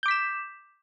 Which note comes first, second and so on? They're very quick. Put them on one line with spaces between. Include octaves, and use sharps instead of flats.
G6 D6 B6 E7